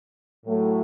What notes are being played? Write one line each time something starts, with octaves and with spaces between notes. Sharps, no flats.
A2 F#3 A3